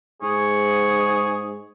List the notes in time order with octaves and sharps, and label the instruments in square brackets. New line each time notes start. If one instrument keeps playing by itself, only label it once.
[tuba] G#2 [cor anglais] G#4 [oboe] C#5